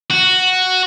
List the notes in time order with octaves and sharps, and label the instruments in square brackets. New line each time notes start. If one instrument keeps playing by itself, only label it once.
[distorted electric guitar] F#4